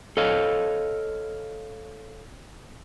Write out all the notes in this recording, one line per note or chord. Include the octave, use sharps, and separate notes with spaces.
A4 C#5 D#5 F5